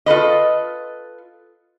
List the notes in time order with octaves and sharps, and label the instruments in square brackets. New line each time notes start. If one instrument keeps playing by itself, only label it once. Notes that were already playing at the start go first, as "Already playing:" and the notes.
[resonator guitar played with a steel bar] F4 A4 B4 D#5